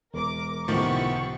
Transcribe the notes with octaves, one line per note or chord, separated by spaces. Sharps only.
E1 A#4 D6
C#2 A2 C3 D#3 F3 B3 C#6